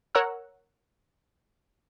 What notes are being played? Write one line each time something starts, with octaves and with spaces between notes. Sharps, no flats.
A#4 C#5 F#5 A#5 E6